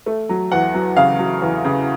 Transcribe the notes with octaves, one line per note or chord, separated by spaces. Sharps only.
A3
F#3
E2 F#5
F#3
C#3 F5
F#3
E2
C#3